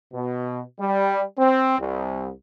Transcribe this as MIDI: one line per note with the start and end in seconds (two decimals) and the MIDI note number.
0.14 0.62 47
0.80 1.24 55
1.38 1.76 60
1.79 2.32 36